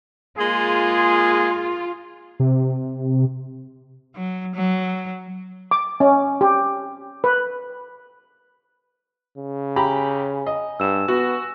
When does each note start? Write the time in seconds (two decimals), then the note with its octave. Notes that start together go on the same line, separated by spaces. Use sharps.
0.39 G#3 A#3 F4 G#4
2.40 C3
4.16 F#3
4.55 F#3
5.71 D6
6.00 C#4
6.41 G4
7.24 B4
9.37 C#3
9.76 G4 G#5 A#5 B5
10.47 D#5
10.80 G2 E6 E7
11.08 B3 F#4 A#6